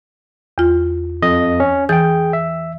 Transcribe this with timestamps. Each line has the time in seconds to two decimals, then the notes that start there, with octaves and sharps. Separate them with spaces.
0.58 E2 F4
1.22 F2 D#5
1.60 C#4
1.89 E3 G#4 G5 A6
2.33 E5